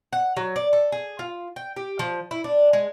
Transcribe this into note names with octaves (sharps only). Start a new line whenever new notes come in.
F#5
F#3
D5
A4
G#4
F4
G5
G4
F3
E4
D4
G#3